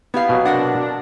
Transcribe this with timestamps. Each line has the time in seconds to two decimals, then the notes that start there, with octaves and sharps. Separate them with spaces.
0.14 B3 E4 G4 F5
0.29 B2 F#3
0.45 C3 D4 A#4 F#5